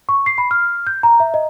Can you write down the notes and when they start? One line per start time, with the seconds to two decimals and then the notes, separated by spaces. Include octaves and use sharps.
0.09 C#6
0.26 C7
0.38 B5
0.51 F6
0.87 G6
1.03 A#5
1.20 E5
1.34 D#5